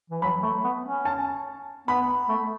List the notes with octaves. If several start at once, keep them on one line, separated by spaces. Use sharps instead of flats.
E3
F#3 B5
A3
B3
C#4
A5
B3 B5
A3